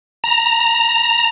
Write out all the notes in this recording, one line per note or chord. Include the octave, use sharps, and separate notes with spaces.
A#5